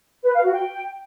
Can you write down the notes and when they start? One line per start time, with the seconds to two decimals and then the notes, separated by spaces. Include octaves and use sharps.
0.24 B4
0.34 F5
0.43 F#4
0.53 G5